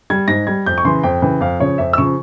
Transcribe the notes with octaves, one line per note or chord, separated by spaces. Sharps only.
G3 G#6
G#2 A#6
G3 G#6
F2 G6
C#6
C#3 E3 C6
F2 G5
C#3 E3 G5
F2 F5
C#3 F3 C#5
F2 E5
E6
C#3 F3 C#6